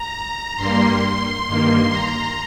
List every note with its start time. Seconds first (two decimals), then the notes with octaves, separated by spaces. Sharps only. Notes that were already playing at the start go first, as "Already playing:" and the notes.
Already playing: A#5
0.56 G2 G3 A#3 C6
1.46 G2 D#3 A#3 C6
1.91 A#5